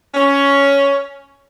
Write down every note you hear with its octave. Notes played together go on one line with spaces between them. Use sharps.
C#4